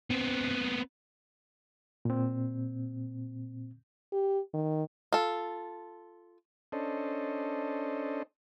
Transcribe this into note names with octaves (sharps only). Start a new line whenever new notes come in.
B3 C4
A#2 C4
G4
D#3
F4 A4
C#4 D4 A4 C5 D#5